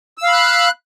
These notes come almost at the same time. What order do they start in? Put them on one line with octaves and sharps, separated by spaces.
E6 F5 B5 F#6